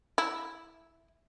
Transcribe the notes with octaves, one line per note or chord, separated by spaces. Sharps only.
E4